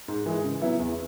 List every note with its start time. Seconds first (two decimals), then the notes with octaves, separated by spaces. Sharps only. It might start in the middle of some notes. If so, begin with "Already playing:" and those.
0.08 G#2
0.26 E3 G#3
0.44 C#3
0.62 F#3 B3 E4
0.79 E2